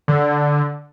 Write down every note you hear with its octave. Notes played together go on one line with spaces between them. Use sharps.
D3